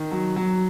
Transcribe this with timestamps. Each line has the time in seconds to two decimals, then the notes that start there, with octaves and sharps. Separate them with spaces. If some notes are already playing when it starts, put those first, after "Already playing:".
Already playing: D#3
0.12 F#3
0.36 F#3